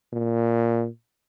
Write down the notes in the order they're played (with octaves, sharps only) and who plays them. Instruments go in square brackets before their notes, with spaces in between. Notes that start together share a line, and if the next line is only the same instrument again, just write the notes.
[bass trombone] A#2